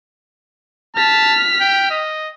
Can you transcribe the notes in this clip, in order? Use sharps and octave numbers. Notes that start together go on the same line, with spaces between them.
A5 F6 B6
G5
D#5